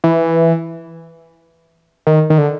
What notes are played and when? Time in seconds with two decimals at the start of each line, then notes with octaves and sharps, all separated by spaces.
0.04 E3
2.07 D#3
2.30 D#3
2.38 D3